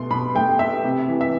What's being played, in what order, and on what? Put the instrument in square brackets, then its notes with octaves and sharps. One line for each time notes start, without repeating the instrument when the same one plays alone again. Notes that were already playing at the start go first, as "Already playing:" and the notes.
Already playing: [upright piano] B2 A3 C6
B2 B5
A3 G5
A3 E5
C3
E3
E5